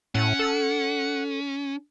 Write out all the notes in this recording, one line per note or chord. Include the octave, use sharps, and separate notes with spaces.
A2 C#4 F#5
A4